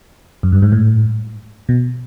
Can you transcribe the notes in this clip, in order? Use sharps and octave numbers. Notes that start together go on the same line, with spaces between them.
F#2
G2
G#2
A2
B2